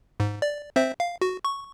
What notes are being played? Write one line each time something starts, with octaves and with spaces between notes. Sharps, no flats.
G#2
D5
C4 C5 E5
F5
F#4
C#6